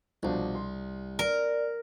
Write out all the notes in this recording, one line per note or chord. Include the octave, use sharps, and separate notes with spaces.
C2 B2 F3 D4
C6
A#4 D5